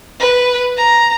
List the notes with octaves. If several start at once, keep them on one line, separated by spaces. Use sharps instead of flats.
B4
A#5